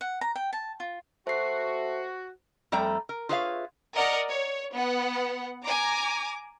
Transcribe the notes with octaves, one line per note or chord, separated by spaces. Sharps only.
F#5
A#5
G5
A5
F4
A3 F#4 C5 C7
F2 G3 A3 G5 A#5
A#4
F4 G#4 B4 C#5 E5 F5
A#4 D5 D#5 F#5
C#5
B3 F#5
G#5 A#5 D6